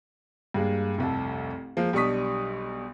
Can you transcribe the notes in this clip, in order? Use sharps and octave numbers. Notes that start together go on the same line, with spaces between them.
G2 G#3 A#3
F1 C2 A4
F3 G#3 A#3
B1 G3 D4 C#6 D#6 B6